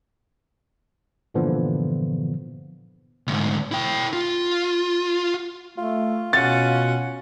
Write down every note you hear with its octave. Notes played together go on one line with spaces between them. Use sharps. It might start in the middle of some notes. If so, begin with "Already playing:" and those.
G2 A#2 D3 E3 F3 B3
D2 G#2
E4 G5
F4
A3 F4
B2 C#4 F#5 A6